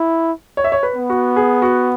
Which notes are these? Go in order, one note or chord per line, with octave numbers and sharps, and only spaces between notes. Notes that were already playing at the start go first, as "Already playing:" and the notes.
Already playing: E4
C#5
E5
C#5
B4
B3
F#4
G#4
F#4